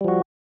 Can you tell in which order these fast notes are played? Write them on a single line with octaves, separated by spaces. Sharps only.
G3 F3 F#4